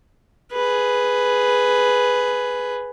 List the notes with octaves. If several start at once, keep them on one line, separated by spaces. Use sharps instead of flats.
G#4 B4